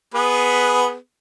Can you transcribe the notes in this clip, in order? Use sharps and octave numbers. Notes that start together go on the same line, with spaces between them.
B3 G#4 B4